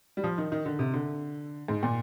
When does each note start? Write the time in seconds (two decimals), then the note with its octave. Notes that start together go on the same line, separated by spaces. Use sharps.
0.17 G3
0.24 F3
0.38 D#3
0.52 D#3
0.65 D3
0.79 C3
0.93 D3
1.68 G#2
1.83 A#2